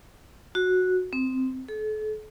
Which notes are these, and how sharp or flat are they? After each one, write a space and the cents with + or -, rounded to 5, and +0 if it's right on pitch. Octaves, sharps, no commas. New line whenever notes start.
F#4 -10
C4 -10
A4 -40